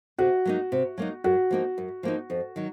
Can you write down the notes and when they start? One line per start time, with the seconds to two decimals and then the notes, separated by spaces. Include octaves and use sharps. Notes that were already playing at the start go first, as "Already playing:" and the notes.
0.18 C3 F#4
0.45 F#3 A#3 D#4
0.72 C3
0.98 F#3 A#3 D#4
1.24 F#2 F#4
1.51 F3 A#3 D#4
1.78 F#2
2.03 F3 A#3 D#4
2.30 F2
2.56 D#3 F#3